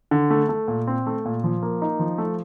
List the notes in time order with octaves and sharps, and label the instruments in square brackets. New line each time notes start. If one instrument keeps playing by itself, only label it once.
[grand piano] D3
A3
A3
A#2
C4
A3
A#2
F3
A#3
D#4
F3
A3